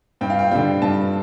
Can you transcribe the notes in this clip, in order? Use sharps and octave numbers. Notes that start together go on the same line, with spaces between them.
G2 G5
F5
G5
D3 G3 G5
G2 A5